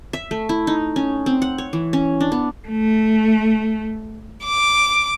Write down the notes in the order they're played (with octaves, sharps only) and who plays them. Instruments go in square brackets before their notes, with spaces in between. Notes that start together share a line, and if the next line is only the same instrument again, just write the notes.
[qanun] E5
A3
E4
D#4
C#4
C4
F#5
C#5
E3
C#4
D4
B3
[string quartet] A3
D6